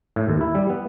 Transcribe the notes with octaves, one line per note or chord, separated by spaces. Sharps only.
A2
D#2
E4
G3
B3